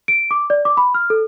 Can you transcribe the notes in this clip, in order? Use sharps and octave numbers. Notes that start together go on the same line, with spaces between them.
D7
D6
D5
D6
B5
F6
A4